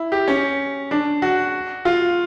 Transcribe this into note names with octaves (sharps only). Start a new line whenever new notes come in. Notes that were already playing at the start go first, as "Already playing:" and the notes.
Already playing: E4
G4
C#4
D4
F#4
F4